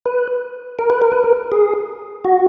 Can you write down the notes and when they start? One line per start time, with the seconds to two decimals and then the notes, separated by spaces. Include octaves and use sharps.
0.05 B4
0.79 A#4
0.90 B4
1.02 A#4
1.12 B4
1.24 A#4
1.52 G#4
2.25 F#4